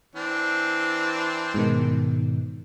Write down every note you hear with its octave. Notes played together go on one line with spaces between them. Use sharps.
E3 C4 D4
G#2 B2 D#3